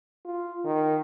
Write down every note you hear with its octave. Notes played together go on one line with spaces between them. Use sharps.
F4
D#3